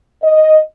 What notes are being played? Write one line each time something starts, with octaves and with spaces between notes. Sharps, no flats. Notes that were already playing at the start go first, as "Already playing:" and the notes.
D#5